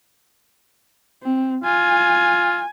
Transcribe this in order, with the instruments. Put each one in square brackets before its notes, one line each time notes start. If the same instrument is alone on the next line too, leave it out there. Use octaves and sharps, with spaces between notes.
[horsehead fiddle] C4
[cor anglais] F4 [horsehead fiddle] G#5